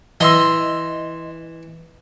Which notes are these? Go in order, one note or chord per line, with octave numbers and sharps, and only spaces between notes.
E3 D#5 C6 E6